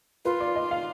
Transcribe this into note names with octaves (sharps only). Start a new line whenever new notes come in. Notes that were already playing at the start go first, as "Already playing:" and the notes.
F4 B4
D5
D#5
F5